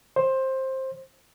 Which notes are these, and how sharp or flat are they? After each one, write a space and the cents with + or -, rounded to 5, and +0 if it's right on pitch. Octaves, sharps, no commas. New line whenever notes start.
C5 +15